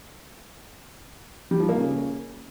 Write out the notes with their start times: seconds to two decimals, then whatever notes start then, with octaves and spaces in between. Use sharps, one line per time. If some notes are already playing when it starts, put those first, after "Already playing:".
1.51 G3
1.60 F3
1.69 A#3
1.78 C#3